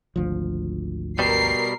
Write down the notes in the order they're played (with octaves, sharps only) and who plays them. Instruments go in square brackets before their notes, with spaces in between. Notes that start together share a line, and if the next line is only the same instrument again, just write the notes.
[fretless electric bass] G#1 D2 F3
[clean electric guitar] B2 G3 [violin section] A#4 C7